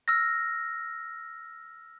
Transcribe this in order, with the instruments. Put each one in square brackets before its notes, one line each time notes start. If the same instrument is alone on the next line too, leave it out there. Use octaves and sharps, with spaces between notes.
[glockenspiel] E6 F6 A#6